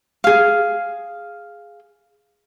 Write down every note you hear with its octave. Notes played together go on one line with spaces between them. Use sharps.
G#4 F5